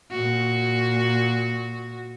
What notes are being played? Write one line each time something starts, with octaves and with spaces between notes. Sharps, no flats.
A#2 F#4